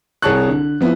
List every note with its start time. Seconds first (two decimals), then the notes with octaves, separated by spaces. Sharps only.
0.22 C2 G#4 C#5 A5 C#6 F#6
0.48 D3
0.81 F3 B3 E4